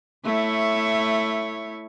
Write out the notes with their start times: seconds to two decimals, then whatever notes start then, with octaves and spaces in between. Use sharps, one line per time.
0.25 A3 E4 C#5